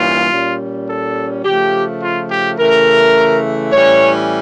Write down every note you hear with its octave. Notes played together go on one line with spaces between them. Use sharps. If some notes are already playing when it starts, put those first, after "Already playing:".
Already playing: G2 E3 G3 A#3 C#4 F4
A#2 G3 C#4
A4
C#3 F3 A3 G4
F4
G4
C#3 E3 A3 A#4
A2 E3 G3 C#4 C#5